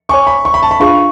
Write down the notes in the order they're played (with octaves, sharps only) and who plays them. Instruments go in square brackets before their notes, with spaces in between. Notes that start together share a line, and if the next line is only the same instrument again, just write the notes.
[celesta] C#5 G#5 D6 [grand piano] C#6
[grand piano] B5
C#6
B5
A5
B5
[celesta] D4 F4 G#4 B4 F5 [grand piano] C#6